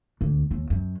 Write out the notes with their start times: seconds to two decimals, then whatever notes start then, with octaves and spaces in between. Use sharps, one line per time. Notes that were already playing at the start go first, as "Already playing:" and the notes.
0.21 D2
0.51 D#2
0.70 F#2